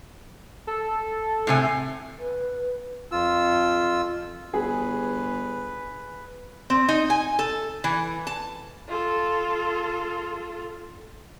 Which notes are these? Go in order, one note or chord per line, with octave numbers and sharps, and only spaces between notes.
A4
A2 C3 G#5
B4
F2 F4 E6
G1 G#4 B4
C4
D#4
G#5
A4
E3
A5
F4 A4